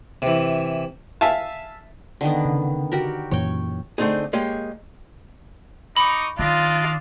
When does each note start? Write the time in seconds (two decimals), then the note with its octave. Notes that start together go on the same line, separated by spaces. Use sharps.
0.22 C3 E3
1.21 E5 F5 G#5 A5
2.21 D3 D#3 B3
2.45 C#3
2.92 F#4 G4 A#4
3.31 F#2 A#2 E3 C#5 G5
3.98 D3 A3 C4 D#4 G#4
4.33 G#3 A#3 G4 G#4 C#5 D#5
5.97 D#4 B5 C#6 D6
6.39 D#3 D4 F4 D5 D#5